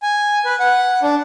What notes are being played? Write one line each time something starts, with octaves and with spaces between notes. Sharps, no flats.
G#5
B4
F#5
D4